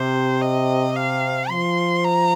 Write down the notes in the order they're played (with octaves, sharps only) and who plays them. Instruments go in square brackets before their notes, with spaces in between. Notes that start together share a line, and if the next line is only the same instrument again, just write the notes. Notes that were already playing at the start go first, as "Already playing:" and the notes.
Already playing: [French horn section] C3 [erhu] C5
[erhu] D#5
F5
[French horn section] F3 [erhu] C6
[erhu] A#5